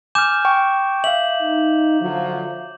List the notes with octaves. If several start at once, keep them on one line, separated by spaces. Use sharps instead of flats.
G#5 D6 F6 G6 E7
G5 C#6
E5 F5 F#7
D#4
D3 F3 F#3